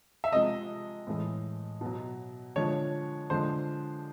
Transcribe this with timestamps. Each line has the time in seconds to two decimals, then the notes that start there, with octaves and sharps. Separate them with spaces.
0.24 E5
0.33 C3 F3 G#3 D#5
1.07 A2 E3 G#3
1.81 B2 F#3
2.56 D3 F3 G#3 C#5
3.30 D3 F3 G#3 C5